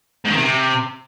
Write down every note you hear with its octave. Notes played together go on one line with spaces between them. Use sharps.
G#2
D#3
C3